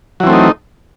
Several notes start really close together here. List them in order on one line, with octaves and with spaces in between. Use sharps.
F#3 E3 C4 A3 D#4